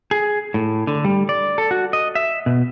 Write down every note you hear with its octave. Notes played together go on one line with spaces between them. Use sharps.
G#4
A2
D3
G3
D5
A4
F#4
D#5
E5
B2